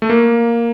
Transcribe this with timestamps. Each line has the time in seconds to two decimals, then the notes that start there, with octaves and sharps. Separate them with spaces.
0.02 A3
0.10 A#3